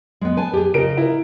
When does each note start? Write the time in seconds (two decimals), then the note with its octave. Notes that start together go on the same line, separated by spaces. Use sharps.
0.21 G#3 B3
0.37 B4 G#5 A5
0.53 G4 G#4
0.74 C#3 A#4 D#5 D7
0.97 E4 A#4